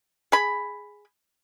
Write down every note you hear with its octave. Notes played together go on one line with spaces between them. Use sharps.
G#4 B5